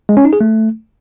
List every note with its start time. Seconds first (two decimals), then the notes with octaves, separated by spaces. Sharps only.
0.09 G#3
0.17 C#4
0.25 D#4
0.33 G#4
0.41 A3